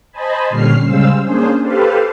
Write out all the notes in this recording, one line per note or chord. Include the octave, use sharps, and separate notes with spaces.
C5 D#5 G#5 A5 B5
A#2 D3 G3 C#4 F6 C7
C#3 G3 G#3 C5 F5 E6
A#3 C#4 D4 G#4 C5
G4 A4 B4 C5 F5